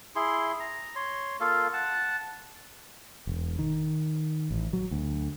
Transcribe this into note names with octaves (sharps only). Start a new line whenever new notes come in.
E4 G#4 C6
A#5
C#5 C6
A#3 F4 A4 F5
F#5 A5
E1
D#3
A1
F#3
D2